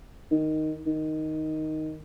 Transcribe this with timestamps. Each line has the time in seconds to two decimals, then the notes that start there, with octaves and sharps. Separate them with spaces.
0.31 D#3
0.86 D#3